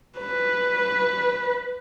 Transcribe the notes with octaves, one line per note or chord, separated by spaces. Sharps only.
B4